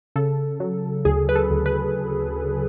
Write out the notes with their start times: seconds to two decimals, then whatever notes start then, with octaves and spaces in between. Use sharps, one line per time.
0.16 C#3 A4
0.60 F#3
1.05 D2 G#4
1.29 B4
1.35 A4
1.51 D2
1.66 B4